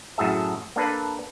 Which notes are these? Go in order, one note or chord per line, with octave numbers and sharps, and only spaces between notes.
F#2 A2 F#4 G#4 E5 A5
A#3 D4 A4 B4